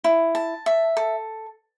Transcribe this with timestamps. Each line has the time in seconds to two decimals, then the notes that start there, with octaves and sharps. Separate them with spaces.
0.04 E4
0.35 A5
0.66 E5
0.97 A4